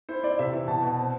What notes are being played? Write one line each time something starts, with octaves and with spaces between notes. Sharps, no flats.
E4 C5
E4 D5
C3 E5
E3
B2 A5
B2
C4